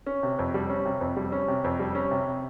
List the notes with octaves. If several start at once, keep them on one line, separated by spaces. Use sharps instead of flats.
C#4
C3
F2
G3
C#4
C3
F2
G3
C#4
C3
F2
G3
C#4
C3